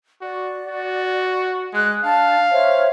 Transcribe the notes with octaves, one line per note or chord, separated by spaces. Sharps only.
F#4 D5
F#4
G#3 F#6
D4 F5 A5
C5 C#5 E5